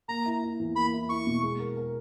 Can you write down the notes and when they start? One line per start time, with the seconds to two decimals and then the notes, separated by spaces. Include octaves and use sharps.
0.08 A#3 A#5
0.25 E4
0.43 E4
0.59 E2
0.76 A#3 B5
0.93 E4
1.09 E4 C#6
1.27 B2
1.43 G#3
1.60 A#4
1.77 A#4